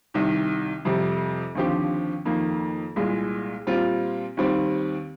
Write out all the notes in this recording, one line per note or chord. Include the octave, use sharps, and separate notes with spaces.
C2 C3 D#3
F2 C3 G3
D#2 D3 F3 C4 G4
F2 D#3 A#3
C2 A#2 G#3
A#2 G3 C4 F4
D#2 D#3 G3 C4